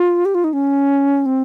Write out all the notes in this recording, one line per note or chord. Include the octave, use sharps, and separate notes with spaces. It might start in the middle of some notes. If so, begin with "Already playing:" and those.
Already playing: F4
G4
F4
D#4
C#4
C4